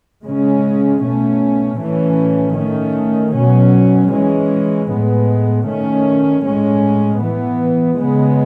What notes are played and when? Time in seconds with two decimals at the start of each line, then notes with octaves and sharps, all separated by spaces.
0.24 C#3 G#3 C#4
1.02 B2 A3 C#4
1.79 A2 E3 A3 C#4
2.56 D#3 A3 C#4
3.33 B2 F#3 C#4
4.11 E3 G#3 C#4
4.89 A2 G#3 B3
5.66 D#3 A3 C#4
6.44 A2 G#3 C#4
7.21 E3 B3
7.98 C#3 G#3 B3